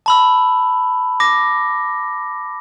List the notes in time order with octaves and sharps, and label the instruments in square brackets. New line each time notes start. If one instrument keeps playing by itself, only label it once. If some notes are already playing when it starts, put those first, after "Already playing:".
[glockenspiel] A5 B5 E6
D6 A#6